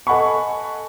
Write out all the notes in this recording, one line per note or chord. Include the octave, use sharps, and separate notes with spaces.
A4 D#5 F#5 G#5 B5 C#6